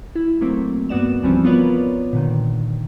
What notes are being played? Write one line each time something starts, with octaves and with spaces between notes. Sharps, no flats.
E4
F#3 A3 A#3 C4
G2 A#3 B3 F#4 D5 E7
C#2 E3 F3 G3 C4 C#4
B3 F4 A#4 B4 C#5 D5
A#2 D3 D#3